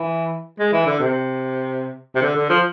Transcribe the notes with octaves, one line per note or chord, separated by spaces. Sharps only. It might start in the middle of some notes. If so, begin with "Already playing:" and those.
Already playing: E3
G#3
E3
D3
C3
C3
D3
D3
F3